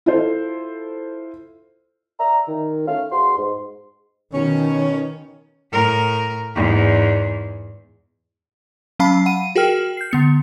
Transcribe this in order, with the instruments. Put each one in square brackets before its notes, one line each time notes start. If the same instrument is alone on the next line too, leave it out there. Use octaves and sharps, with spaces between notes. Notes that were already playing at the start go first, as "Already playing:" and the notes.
[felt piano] E4 F4 A4 C5
[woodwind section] D5 E5 A#5
D#3
A3 C#4 F5
E2 F#4 C6
G#2
[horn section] B2 C#4 [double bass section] D#3
[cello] A2 A#4
E2 G#2
[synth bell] F#3 C#4 F5 A5 B5 C7
F#5 B5 D#7
F#4 G#4 A#4 G5 F6
G6 C7
D3 B3 C#7